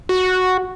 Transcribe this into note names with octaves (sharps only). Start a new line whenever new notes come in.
F#4